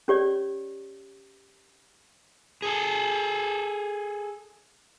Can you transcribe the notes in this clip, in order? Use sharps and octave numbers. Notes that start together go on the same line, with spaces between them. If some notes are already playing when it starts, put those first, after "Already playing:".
C#4 G4 C#5 D5
G#4 A4